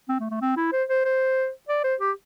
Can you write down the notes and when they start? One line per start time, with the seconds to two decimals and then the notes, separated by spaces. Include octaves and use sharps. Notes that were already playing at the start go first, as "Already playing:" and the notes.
0.08 C4
0.20 A3
0.30 A3
0.41 C4
0.57 E4
0.72 C5
0.89 C5
1.05 C5
1.69 D5
1.84 C5
2.00 G4